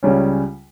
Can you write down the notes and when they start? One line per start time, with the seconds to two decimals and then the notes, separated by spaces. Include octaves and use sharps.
0.03 C#2 C#3 G3 C#4